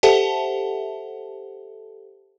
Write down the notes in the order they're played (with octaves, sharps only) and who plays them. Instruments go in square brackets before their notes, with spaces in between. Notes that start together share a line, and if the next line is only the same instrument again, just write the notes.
[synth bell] G4 A4 C5 E5 F#5 A5